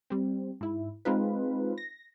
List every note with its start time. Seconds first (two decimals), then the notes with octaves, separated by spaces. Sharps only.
0.10 G3 C4
0.61 G#2 E4
1.05 G#3 C4 D#4 F4 B4
1.78 A#6